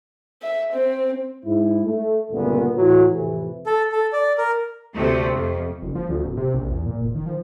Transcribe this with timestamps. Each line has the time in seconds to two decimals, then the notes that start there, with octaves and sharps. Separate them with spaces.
0.42 E5
0.73 C4
1.46 G#2 E4
1.84 A3
2.31 C#2 G2 A#2 D3 A3 B3
2.76 A2 E3 F#3
3.10 F2 A2 C3 E3
3.66 A4
3.92 A4
4.13 D5
4.38 A#4
4.94 D2 C3 A3
5.34 F2
5.82 F#1
5.95 F3
6.09 D2
6.25 D1
6.37 C3
6.54 A#1
6.71 E2
6.86 A#2
7.02 E1
7.15 D#3
7.26 F3